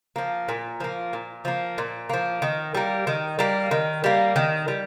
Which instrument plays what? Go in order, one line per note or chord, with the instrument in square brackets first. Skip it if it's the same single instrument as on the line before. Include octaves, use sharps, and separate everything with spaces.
[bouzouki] F3 A#3
A#2
F3 A#3
A#2
F3 A#3
A#2
F3 A#3
D#3
G3 A#3
D#3
G3 A#3
D#3
G3 A#3
D#3
G3